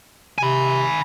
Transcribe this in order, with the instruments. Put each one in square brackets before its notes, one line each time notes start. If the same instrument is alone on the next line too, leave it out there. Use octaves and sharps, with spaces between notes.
[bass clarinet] C3 [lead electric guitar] G#5 B5